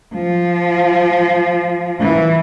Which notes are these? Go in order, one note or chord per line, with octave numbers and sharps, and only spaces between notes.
F3
E3